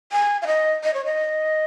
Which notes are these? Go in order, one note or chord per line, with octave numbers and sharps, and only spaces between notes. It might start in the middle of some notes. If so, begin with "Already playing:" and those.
G#5
F5
D#5
D#5
C#5
D#5